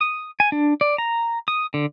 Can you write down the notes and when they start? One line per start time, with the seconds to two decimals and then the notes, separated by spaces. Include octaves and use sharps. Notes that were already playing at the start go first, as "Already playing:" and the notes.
0.01 D#6
0.40 G#5
0.52 D4
0.81 D5
0.98 A#5
1.48 D#6
1.74 D3